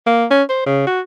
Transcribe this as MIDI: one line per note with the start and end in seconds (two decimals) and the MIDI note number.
0.06 0.25 58
0.31 0.43 61
0.49 0.66 72
0.66 0.86 49
0.87 1.00 66